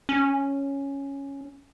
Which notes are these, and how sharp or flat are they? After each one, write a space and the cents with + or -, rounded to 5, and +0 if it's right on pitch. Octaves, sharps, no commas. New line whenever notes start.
C#4 +0